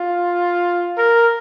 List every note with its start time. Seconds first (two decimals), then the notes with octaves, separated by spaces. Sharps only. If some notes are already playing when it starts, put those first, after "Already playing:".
Already playing: F4
0.97 A#4